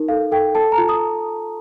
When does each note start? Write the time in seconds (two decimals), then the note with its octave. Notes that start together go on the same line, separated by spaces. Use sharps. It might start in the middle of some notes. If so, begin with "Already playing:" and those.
Already playing: D#4 A#4
0.08 A4 F5
0.32 A4 G5
0.55 A4 A5
0.72 A#5
0.78 F4
0.89 D#6